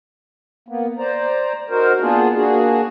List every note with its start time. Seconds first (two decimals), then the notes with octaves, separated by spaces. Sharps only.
0.68 A#3 B3
0.98 C5 D5 A#5
1.70 D#4 F#4 A#4 C5
2.01 A#3 B3 D4 F4 G#4
2.35 A#3 D4 F#4 G#4